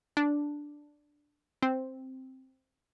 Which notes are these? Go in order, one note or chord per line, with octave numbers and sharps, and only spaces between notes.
D4
C4